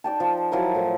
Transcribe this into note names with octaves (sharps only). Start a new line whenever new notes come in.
D#4 D5 G5 A5
F3
F3 F#3 E4 A#4
A2 F3